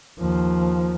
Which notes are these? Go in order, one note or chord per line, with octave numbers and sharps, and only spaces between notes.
D#2 F3